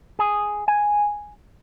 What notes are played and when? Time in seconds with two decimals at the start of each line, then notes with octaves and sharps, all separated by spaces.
0.19 G#4
0.68 G#5